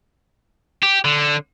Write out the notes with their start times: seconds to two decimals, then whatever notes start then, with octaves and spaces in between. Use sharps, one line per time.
0.83 G4
1.05 D3